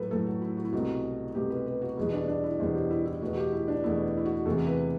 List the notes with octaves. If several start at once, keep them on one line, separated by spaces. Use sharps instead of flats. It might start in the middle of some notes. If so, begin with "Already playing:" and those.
Already playing: A2 F#3 A3 A4 B4
A2 F#3 A3 A4
F#4
E4
F#4
E4
C2 B2 A3 F#4
C2 B2 A3 G4
B4
B4
F#4
E2 B2 G3 E4
D4
D4
E4
E2 B2 G3 C5
G4
E4
E4
E2 B2 A3 F#4
G4
E4
D4
E2 B2 A3 E4
E4
F#4
E2 C3 E3 A3 A4
B4